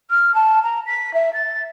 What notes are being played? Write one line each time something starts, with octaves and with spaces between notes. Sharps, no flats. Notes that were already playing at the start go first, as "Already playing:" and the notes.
F6
A5
A#5
B6
E5
A6